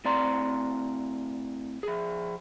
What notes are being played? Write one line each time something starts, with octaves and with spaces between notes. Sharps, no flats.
A2 C4 D5 A#5 C6
F3 G#4